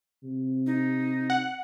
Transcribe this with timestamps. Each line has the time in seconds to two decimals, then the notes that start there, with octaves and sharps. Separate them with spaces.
0.23 C3
0.66 D#4
1.30 F#5